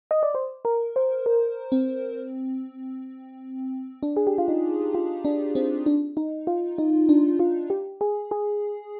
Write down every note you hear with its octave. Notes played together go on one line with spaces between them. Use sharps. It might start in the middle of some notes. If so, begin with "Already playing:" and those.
D#5
D5
C5
A#4
C5
A#4
C4
D4
G#4
G4
F4
D#4
F4
D4
C4
D4
D#4
F4
D#4
D4
F4
G4
G#4
G#4